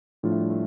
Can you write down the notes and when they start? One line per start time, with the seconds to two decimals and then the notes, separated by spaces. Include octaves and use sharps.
0.23 A2 F3 G3 D4 F4
0.32 A3
0.40 G3
0.50 A3